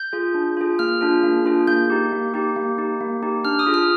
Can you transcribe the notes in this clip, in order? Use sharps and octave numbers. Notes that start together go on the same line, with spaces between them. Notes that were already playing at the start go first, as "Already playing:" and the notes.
Already playing: G6
F4 G#4
D4
F4 G#4
A#3 F6
D4 F4 G#4
A#3
D4 F4 G#4
A#3 G6
D#4 G4
A#3
D#4 G4
A#3
D#4 G4
A#3
D#4 G4
D4 F6
D#6
F4 G#4
F6